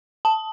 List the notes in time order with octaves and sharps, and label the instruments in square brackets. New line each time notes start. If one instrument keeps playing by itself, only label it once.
[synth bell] A5